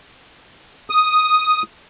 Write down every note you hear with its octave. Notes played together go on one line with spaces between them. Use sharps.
D#6